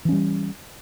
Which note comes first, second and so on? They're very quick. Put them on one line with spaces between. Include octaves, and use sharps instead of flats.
E3 C#4 G3